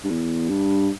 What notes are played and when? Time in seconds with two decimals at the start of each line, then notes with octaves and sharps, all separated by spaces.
0.04 G2
0.10 E2
0.49 G2